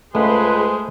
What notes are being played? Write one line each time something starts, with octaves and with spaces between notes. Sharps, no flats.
C#2 G#3 A3 G#4 B4 C5